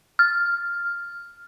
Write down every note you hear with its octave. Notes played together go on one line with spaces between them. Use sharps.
F6